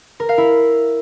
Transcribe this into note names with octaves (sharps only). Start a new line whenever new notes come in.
A#4
F5
E4